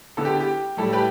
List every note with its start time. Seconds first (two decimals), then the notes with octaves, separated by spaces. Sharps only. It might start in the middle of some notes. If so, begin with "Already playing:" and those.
0.17 D3 B3 E4 A4
0.25 G4
0.41 G4
0.77 A2 G3 E4 A4
0.93 G4 B4